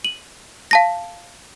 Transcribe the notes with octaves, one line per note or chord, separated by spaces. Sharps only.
D#7 F#7
F5 A5 A#6